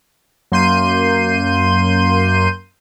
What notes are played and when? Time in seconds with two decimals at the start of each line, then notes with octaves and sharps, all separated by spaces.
0.52 F#2 A#3 C6 G6 D#7